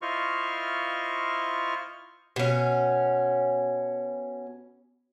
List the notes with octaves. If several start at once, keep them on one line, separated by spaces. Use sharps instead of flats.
E4 F4 C5 D#5 C#6 F6
B2 C#4